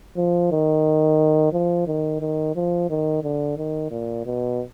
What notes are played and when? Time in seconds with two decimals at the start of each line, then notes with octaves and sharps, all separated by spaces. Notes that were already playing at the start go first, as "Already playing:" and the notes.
0.17 F3
0.52 D#3
1.53 F3
1.87 D#3
2.21 D#3
2.56 F3
2.90 D#3
3.23 D3
3.58 D#3
3.91 A#2
4.26 B2